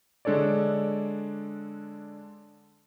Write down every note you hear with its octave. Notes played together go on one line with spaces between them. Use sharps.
D3 G#3 D4 A4 C#5 D5